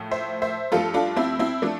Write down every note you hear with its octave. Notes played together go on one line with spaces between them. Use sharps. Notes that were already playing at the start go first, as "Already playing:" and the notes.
Already playing: A2 F3 A3
C5 E5
C5 E5
G2 F3 A3 F4 A4
D4 F4
C4 E4
C4 E4
F3 A3 D4